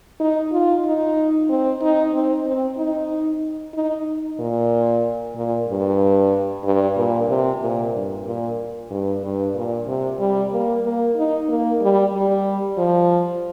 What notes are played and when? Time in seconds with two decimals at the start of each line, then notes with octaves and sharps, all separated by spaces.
0.20 D#4
0.52 F4
0.85 D#4
1.49 C4
1.81 D#4
2.13 C4
2.46 C4
2.77 D#4
3.74 D#4
4.39 A#2
5.35 A#2
5.68 G2
6.64 G2
6.97 A#2
7.29 C3
7.62 A#2
7.94 G2
8.26 A#2
8.91 G2
9.23 G2
9.55 A#2
9.87 C3
10.19 G3
10.52 A#3
10.84 A#3
11.16 D#4
11.49 A#3
11.81 G3
12.13 G3
12.78 F3